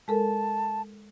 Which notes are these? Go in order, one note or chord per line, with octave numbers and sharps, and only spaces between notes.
G#3 A4 A#4 A5